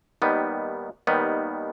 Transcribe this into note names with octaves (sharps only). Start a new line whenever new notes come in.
D#2 D#3 G3 B3
D#2 D#3 G3 B3